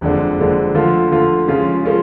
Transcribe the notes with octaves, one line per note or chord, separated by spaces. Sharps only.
F#1 F2 D3 G#3 D4
F#1 F2 D3 G#3 D4
D3 F3 A3 F4
D3 F3 A3 F4
C#3 F3 G#3 C#4 F4
F3 G#3 C#4 F4